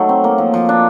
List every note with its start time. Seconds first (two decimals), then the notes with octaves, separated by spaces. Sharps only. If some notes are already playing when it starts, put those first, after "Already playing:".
Already playing: F#3 A3 D#4
0.09 C4
0.24 A#3
0.38 F3
0.54 F3
0.69 D4